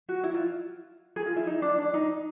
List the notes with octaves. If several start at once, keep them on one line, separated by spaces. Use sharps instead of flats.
F#4
E4
F4
G#4
F4
E4
D#4
D4
D4
D#4